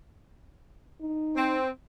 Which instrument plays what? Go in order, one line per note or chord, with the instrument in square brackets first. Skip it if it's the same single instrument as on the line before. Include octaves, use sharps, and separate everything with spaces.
[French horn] D#4
[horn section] C4